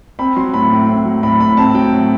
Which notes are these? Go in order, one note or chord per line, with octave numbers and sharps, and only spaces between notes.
C4 B5
F#3 C6
A2 B5
A2
C4
F#3
A2 B5
A2 B5
C4 A5
F#3 G5
A2